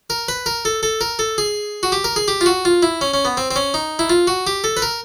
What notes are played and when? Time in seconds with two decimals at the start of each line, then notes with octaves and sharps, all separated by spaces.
0.10 A#4
0.28 B4
0.46 A#4
0.65 A4
0.83 A4
1.01 A#4
1.19 A4
1.38 G#4
1.83 F#4
1.92 G4
2.04 A#4
2.16 G#4
2.28 G4
2.41 F4
2.46 F#4
2.65 F4
2.83 E4
3.01 C#4
3.14 C#4
3.25 B3
3.37 C4
3.51 C4
3.56 C#4
3.74 D#4
3.99 E4
4.10 F4
4.27 F#4
4.47 G4
4.64 A4
4.77 B4
4.82 A#4